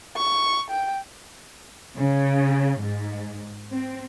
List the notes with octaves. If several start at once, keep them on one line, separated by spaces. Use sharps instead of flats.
C#6
G5
C#3
G#2
C4